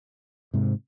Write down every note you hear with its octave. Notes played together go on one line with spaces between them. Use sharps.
G#2 C3